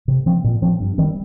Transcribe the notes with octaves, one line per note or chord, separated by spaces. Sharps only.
C3
F3 C4
A#2
F3 C4
G2
D#3 G3 C4